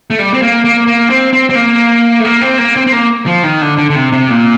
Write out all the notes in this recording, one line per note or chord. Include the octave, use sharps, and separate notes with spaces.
A3
G3
C4
A#3
A#3
A#3
C4
C4
C4
A#3
A3
A#3
C4
A#3
C4
C4
A#3
F3
D#3
D3
D3
D3
C3
C3
A#2